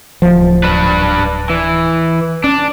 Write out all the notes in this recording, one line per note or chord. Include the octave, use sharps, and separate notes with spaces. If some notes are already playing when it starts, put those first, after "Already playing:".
D1 F3
D4 B4
E3
C#4 D4